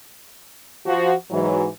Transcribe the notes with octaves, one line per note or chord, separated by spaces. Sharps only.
F3 F#4
G#2 E3 F#3